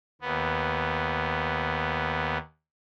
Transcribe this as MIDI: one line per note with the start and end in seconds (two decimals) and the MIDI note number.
0.22 2.38 39
0.22 2.38 59